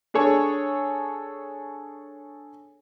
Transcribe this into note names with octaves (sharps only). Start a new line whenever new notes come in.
D4 G#4 A4 C#5